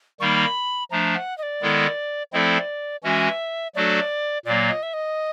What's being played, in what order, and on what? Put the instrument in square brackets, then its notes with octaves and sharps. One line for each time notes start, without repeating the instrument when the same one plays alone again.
[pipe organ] D#3 G3 A#3 D#4 [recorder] B5 C#6
[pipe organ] F3 A3 D4 [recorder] A#5
[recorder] F#5
D#5
D5
[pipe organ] D#3 G#3 B3 E4 A4
[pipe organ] F3 A3 C4 E4 A4 [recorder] D5 D#5
[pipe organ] E3 G#3 C#4 F#4 [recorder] E5
[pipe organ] F#3 A3 D4 F#4 A4 [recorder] D5
[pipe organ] A#2 F#3 A#3 [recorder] D5
[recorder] D#5
E5
D#5